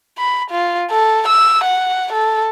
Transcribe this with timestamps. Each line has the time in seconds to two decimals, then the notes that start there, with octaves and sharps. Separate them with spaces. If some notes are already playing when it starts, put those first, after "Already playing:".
0.18 B5
0.50 F4
0.91 A4
1.28 E6
1.64 F#5
2.12 A4